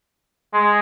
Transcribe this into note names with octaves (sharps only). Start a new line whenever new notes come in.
G#3